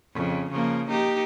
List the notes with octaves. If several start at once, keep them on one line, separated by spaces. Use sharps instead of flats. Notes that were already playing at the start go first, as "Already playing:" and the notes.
F2 C#3
C#3 F3 A#3
A#3 D#4 G4